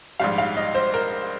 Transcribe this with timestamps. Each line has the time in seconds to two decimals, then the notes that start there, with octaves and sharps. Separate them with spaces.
0.20 A#1 G#2 G3 F5
0.38 F5
0.57 D#5
0.75 C5
0.94 A#4